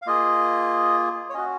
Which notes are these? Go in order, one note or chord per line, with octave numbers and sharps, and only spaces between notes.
F5
A#3 F4 G#4 D#5
C#5
C#4 F#4 D#5